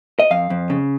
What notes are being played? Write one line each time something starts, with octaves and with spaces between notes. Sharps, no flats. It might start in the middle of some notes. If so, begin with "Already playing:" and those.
D#5
F2 F5
F2
C#3